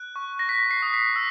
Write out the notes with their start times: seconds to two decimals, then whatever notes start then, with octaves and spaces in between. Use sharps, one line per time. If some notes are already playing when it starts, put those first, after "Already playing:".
Already playing: F#6
0.16 C#6
0.39 A#6
0.49 F#6 B6
0.71 C7
0.82 D#6
0.94 B6
1.16 E6